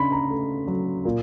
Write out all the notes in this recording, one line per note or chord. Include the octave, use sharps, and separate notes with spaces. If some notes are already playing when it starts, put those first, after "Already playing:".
Already playing: C#3 D4 B5 C6
A#5
A3
F#3
A#2